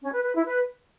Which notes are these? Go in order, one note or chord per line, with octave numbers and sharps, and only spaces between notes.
C#4
B4
B4
E4
B4